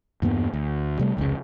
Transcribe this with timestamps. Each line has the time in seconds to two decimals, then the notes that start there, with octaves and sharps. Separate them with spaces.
0.22 E2 G2 A#3 B3
0.53 D2
0.99 C3 G3 A3
1.17 F1 C#2 G#2 C#3